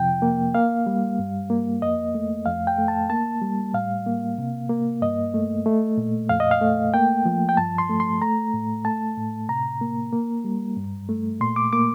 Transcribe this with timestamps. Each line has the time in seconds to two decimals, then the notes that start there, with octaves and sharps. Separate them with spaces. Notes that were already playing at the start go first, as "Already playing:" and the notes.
Already playing: F2 C3 F3 G5
0.22 A#3
0.55 A#3 F5
0.87 G3
1.19 G2
1.50 A#3
1.82 F2 D#5
2.15 A3
2.46 F2 F5
2.67 G5
2.78 A3
2.88 A5
3.10 A#3 A5
3.42 G3
3.74 A2 F5
4.06 A#3
4.38 C3
4.69 A#3
5.02 G2 D#5
5.34 A3
5.66 A3
5.98 A#2
6.29 F2 F5
6.40 D#5
6.51 F5
6.61 A3
6.94 A#3 G5
7.25 F3
7.49 G5
7.57 G2 A5
7.78 C6
7.89 A3
8.00 C6
8.22 A3 A#5
8.54 A2
8.85 A3 A5
9.17 A2
9.49 C3 A#5
9.81 A#3
10.13 A#3
10.44 G3
10.77 G2
11.09 A3
11.41 A#2 C6
11.56 D6
11.73 A#3 D6